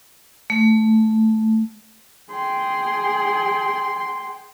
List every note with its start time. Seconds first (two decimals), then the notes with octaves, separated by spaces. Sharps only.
0.50 A3
2.30 G#4 G5 C6